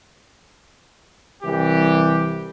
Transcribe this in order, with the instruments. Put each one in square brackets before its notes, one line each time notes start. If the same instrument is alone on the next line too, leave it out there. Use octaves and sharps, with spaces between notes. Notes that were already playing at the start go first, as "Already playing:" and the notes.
[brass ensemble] C2 E3 G4